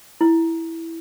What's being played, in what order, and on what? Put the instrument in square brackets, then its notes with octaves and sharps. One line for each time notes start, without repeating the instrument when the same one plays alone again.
[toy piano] E4